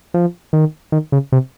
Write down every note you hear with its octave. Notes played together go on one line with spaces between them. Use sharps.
F3
D#3
D#3
C#3
C3